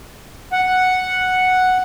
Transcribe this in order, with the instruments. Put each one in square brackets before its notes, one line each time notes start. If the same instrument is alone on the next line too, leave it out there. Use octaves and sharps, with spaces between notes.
[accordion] F#5